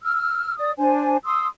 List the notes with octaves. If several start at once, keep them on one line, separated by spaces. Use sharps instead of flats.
E6 F6
D5 D#6
D4 C5 G#5
C6 D#6 E6